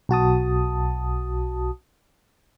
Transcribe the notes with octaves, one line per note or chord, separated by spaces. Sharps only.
B1 F#4 A5 D#6